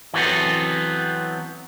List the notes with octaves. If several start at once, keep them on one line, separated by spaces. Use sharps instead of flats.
E3 F#3 B3 C4 A4